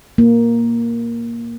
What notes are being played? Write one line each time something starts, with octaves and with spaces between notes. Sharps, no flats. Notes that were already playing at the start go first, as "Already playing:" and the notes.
A#3